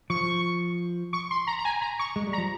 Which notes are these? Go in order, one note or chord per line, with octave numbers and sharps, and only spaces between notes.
F3 C#6
C#6
C6
A#5
A#5
G#5
A#5
C#6
G#3
G3
A#5
F3